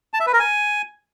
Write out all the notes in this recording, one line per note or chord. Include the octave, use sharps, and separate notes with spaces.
A5
E5
B4
A#4
G#5